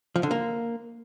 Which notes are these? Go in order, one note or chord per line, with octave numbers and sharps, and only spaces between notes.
F3
D3
A#3